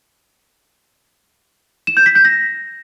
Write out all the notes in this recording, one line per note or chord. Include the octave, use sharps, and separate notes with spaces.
E7
G6
B6
G6
A#6